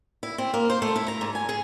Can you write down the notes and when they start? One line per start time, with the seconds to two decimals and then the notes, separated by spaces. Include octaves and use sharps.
0.23 E4
0.38 C4
0.54 A#3
0.70 C5
0.82 A3
0.96 E4
1.08 A#5
1.21 G#2
1.35 G#5
1.49 G#4